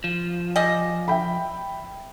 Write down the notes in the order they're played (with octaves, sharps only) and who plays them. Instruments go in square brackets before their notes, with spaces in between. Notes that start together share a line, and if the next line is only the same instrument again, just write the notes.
[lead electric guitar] F3
[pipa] G3 G#4 D#5
[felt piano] E5 G5 B5